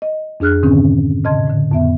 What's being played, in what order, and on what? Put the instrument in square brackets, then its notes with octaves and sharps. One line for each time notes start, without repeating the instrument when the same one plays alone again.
[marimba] D#5
F2 D4 G#4 F6 F#6
G#2 B2 D3 D#3 C4 C#4
A2 C#3 D#5 A5 C6 G#6
A2 D3
F2 B3 E5